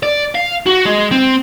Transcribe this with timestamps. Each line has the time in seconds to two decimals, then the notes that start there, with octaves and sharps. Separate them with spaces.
0.03 D5
0.35 F5
0.67 F#4
0.86 G#3
1.11 C4